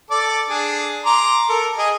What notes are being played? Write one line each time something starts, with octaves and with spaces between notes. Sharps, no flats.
A4 D5 D6
D4 G#4
A#5 C6 D6
A4 A#4
G#4 D#5